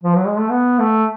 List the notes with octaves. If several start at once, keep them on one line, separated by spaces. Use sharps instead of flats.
F3
F#3
G#3
A3
B3
A3